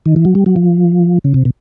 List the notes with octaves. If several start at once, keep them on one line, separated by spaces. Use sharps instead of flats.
D#3
E3
F#3
G3
F#3
F3
C#3
C3
B2